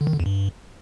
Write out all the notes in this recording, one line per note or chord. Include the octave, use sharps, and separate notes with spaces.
D3
D#3
D3
E2
G2